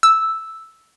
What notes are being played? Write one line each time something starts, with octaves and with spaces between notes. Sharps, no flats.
E6